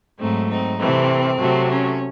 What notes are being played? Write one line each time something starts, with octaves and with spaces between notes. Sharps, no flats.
G#2 F#3 A3 C4 D#4
C4 D#4
C3 E3 A3 C4
C3 F#3 A3
C#4